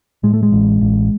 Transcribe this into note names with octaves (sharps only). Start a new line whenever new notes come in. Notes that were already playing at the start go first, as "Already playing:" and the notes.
A2 G#3
A3
G#3
A1
A1